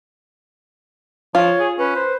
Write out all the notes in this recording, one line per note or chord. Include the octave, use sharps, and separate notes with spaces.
F3 F4 C#5
G#4
C#4 B4
C5